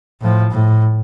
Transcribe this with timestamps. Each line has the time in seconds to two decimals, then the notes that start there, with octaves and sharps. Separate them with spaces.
0.21 A2 F3
0.51 A2